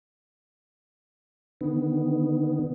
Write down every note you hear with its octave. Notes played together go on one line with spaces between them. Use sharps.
D3 D#3 B3